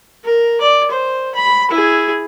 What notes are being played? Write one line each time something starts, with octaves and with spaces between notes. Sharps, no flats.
A#4
D5
C5
B5
E4 G#4